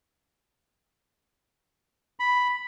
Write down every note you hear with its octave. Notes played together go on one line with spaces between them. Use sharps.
B5